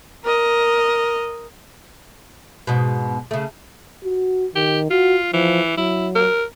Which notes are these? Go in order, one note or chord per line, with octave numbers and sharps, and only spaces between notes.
A#4 D#5
G#2 B2
C#3 A3
F#4
D#3 G4
F4 F#4
E3 F3
F#3 E4
A#4